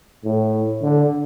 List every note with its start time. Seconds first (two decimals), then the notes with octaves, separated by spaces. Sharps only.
0.24 A2
0.82 D3